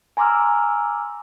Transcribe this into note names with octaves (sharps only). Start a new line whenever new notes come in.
G#5 A#5 C6 D6 E6 F6